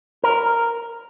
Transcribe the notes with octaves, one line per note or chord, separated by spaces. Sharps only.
A#4